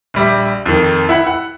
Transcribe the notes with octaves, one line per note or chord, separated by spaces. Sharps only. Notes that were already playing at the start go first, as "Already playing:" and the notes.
A#1 G3 E5
F2 D#3
E4 F#5 B5
F#5